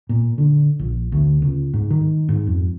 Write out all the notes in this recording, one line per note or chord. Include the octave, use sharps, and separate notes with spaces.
A#2
D3
A#1
D2
C#2
G#2
D#3
G#2
F2